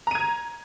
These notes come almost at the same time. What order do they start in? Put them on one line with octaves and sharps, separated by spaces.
A#5 D#7 G#6